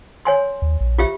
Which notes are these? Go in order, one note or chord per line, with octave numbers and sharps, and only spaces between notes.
C#5 G#5 C6
D#2
A#1
F4 G4 E5